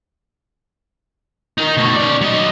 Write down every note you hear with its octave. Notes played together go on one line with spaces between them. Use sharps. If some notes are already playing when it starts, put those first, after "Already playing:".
D#4 A#4
B2 A3
C#4 D5
F#3 D#5